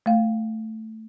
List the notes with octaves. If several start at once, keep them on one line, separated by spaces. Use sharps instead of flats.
A3 F5